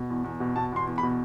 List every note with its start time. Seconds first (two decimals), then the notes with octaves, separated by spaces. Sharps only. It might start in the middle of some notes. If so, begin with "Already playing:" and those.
Already playing: B2
0.10 E2
0.24 E2
0.40 B2
0.56 B2 A5
0.72 E2 C6
0.87 E2
0.98 B5
1.03 B2